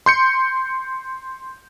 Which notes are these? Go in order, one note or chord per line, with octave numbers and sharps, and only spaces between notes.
C6 G6 C#7